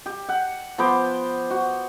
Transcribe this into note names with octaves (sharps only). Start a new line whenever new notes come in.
G4
F#5
F3 B3 C5 D6
F#4